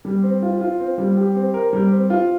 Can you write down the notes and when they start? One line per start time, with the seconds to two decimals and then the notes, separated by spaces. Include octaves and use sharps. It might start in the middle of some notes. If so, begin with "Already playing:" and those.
0.05 G3
0.23 C4
0.42 F4
0.61 F4
0.80 C4
0.98 G3
1.17 G4
1.35 C4
1.54 A#4
1.73 G3
1.92 C4
2.10 F4